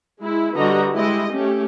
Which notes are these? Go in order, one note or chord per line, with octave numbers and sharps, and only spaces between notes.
G#3 E4
D3 G3 F#4 B4 D#5 A#5
G#3 E4 G4 D#5
A3 C#4 G4